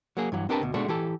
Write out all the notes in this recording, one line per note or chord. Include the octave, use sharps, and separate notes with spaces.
F#3 A#3 G#4
G2 E3 F#3
C4 D4 G4 A#4 B4 A5
D2 B2
B2 G#3 A3 D4 F#4
E3 G4 A4